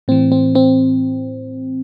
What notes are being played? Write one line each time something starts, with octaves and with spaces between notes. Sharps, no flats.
A2 E3 C4
C4
C4